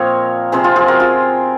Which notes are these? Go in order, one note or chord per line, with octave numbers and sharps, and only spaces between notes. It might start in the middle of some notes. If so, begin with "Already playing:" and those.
Already playing: A#2 F3 C4 A#4 C#5 D#5
C3 F3 C4 G#4 C5
F4 G#4
F4 G#4
F#4 A#4
F4 G#4